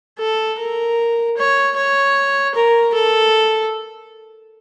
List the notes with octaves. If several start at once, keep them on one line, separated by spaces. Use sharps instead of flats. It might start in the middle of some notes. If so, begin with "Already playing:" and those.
A4
A#4
C#5
C#5
A#4
A4